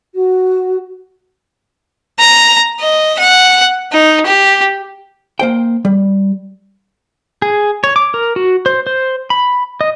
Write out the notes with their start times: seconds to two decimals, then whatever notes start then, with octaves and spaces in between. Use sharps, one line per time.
0.14 F#4
2.19 A#5
2.80 D#5
3.18 F#5
3.92 D#4
4.26 G4
5.39 A#3 C5 G5
5.85 G3
7.42 G#4
7.84 C#5
7.96 D6
8.14 A#4
8.36 F#4
8.66 C5
8.87 C5
9.30 B5
9.81 D#5